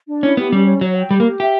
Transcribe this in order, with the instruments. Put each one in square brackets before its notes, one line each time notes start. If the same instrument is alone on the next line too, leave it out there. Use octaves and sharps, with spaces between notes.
[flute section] D4
[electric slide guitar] C#4 [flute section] E4
[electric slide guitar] B3 [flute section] G4
[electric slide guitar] G3 [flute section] C#4
[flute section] C#5
[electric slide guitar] F#3 [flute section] C#5
[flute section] G5
[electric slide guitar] G3 [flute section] G4
[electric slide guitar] A#3
[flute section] G4
[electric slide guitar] G4 [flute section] E5